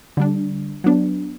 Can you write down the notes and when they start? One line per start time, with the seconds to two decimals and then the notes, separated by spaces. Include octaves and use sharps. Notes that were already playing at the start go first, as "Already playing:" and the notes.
0.17 D3 G3 D4
0.84 F#3 B3 D4